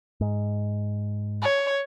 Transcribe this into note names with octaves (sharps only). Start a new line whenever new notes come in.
G#2
C#5